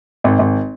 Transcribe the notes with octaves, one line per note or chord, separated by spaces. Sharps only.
G#1
G#1